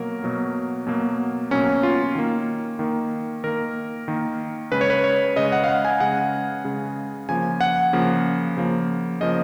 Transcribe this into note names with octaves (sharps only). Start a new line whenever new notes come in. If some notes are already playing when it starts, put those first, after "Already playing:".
Already playing: B2 F#3 A#3 A#4
B2 F#3 A#3
B2 F#3 A#3
B2 F#3 A#3 C#4
F4
D#3 A#3
D#3 A#3
D#3 A#3 A#4
D#3 A#3
C#3 G#3 B4
C#5
B4
C#5
C#3 G#3 D#5
F#5
F5
F#5
G#5
C#3 G#3 F#5
C#3 G#3
C#3 F3 A#3 G#5
F#5
C#3 F3 A#3
C#3 F3 A#3
C#3 F3 A#3 D#5